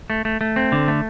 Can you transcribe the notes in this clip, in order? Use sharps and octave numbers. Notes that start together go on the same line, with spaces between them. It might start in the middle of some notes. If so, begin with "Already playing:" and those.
A3
A3
A3
C4
D3
A3